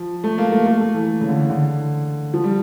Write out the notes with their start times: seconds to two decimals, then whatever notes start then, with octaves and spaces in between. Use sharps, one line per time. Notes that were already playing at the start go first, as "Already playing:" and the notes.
Already playing: F3
0.24 A3
0.38 A#3
0.52 A3
0.66 A3
0.80 A3
0.94 E3
1.08 E3
1.21 C#3
1.29 D3
1.50 D3
2.34 F3
2.44 G3